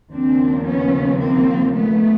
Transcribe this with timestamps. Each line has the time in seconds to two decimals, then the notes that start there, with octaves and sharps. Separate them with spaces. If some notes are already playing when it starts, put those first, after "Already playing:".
0.13 D#2 C#3 F3 C4 D4
0.67 B3 C#4
1.21 A#3 C4
1.75 A3 B3